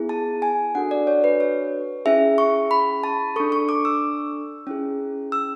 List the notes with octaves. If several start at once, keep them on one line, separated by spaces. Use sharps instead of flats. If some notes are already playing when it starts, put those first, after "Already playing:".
Already playing: B3 E4 G#4
A5
G#5
D4 F#4 A4 F#5
D5
C#5
B4
C#5
C#4 E4 G#4 E5
C#6
B5
A5
D4 A4 C#6
C#6
D6
E6
C#4 E4 G#4
E6